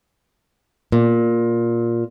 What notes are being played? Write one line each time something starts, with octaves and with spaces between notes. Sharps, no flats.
A#2